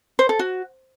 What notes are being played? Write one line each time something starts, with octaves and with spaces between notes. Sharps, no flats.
C5
A4
F#4